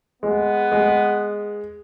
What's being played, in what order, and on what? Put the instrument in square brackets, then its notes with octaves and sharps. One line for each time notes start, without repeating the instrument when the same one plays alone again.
[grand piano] G#3 [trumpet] B3
[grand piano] G#3